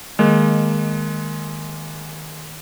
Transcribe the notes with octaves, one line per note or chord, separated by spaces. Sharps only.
D#3 G#3 A#3